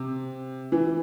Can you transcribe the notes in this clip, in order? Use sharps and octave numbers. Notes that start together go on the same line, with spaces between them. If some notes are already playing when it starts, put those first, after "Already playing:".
Already playing: C3
E3